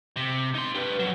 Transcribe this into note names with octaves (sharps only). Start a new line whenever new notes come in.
C3
D#4 C6
G4 B4
F2 F#3